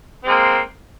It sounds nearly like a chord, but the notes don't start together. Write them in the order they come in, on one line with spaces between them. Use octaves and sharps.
C4 G#3 A#3